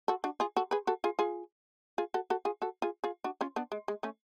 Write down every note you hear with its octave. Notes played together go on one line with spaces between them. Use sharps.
F#4 A4
D4 F#4
F4 G#4
F#4 A4
G#4 B4
F#4 A4
F4 G#4
F4 G#4
F4 G#4
F#4 A4
F#4 A4
F4 G#4
F#4 A4
F4 G#4
F4 G#4
D4 F#4
C#4 F4
B3 D4
G#3
G#3
A3 C#4